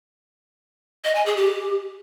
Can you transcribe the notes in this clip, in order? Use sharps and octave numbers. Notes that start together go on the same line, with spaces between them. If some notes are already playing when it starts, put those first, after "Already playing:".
D#5
G#5
G#4
G4